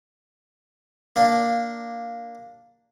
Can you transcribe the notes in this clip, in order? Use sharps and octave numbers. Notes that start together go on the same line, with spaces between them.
A#3 D4